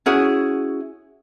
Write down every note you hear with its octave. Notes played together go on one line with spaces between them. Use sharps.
C#4 E4 F#4 G#4